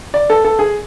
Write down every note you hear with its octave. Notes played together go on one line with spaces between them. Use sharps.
D5
A4
A4
G#4